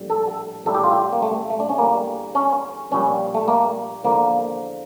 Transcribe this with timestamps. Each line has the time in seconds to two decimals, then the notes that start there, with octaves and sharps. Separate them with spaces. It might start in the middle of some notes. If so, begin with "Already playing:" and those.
Already playing: A#1 A2 E3 G3
0.10 A4
0.65 A1 A2 G3 A4
0.74 G4
0.84 F4
0.93 G4
1.12 A#3
1.22 A3
1.50 A3
1.60 D4
1.69 C#4
1.78 E2 D3 G3 A#3
2.35 C#4
2.91 A#1 A#2 G3 C#4
3.34 A3
3.48 A#3
4.03 E2 D3 F3 A#3